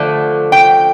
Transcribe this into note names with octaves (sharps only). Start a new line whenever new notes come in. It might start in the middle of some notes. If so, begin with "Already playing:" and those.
Already playing: D3 F3 A3 A5
G5